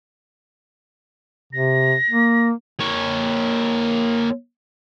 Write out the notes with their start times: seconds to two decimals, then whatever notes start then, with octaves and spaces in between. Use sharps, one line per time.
1.53 C3 A#6
2.11 A#3
2.80 A#3 C#5